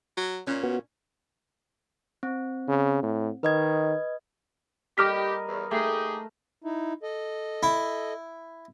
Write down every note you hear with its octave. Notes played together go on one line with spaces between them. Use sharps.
F#3
A#2 C#4
B3 F#4
C4
C#3
A2
D#3 B4 D#5 G#6
G3 G4 A#4 D#5 D6 F6 B6
E2
A3 D#4 G4 G#4
D#4 E4
A4 D#5
E4